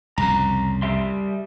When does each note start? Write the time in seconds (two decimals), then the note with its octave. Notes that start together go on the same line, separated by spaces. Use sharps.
0.18 C2 F2 C#3 A#5
0.82 G3 E5 C6